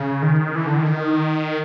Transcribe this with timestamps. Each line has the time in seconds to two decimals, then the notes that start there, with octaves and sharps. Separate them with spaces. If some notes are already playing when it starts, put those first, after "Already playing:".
Already playing: C#3
0.22 D#3
0.55 E3
0.67 D3
0.77 D#3